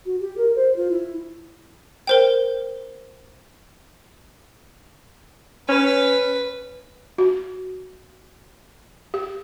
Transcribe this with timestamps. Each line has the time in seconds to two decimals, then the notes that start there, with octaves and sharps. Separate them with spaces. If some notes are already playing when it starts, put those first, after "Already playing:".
0.06 F#4
0.20 G4
0.37 A#4
0.56 C5
0.76 F4
0.90 E4
2.07 A#4 C5 G5
5.68 C#4 B4
7.18 F#4
9.14 G4